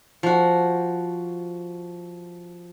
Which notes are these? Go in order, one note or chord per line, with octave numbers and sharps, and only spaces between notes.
F3 F#4